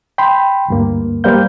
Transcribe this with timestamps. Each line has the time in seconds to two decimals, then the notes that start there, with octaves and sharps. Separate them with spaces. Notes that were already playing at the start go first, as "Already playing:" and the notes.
0.18 G5 B5 C6
0.68 D2 G2 A#3
1.24 G3 A#3 B4 C5 F5 G6